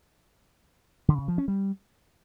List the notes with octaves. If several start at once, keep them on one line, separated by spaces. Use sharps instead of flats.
D3
C#3
F3
C#4
G3